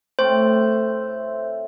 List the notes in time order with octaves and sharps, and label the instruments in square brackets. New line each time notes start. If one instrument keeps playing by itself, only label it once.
[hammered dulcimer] A2 A3 C4 [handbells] C5